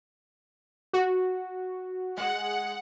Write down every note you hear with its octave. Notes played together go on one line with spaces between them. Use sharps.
F#4
G#3 F#5